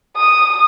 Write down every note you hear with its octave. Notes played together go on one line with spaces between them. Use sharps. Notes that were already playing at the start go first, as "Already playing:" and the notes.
D#6